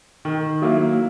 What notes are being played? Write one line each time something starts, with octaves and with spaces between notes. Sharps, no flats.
D#3
F#3 A#3 E4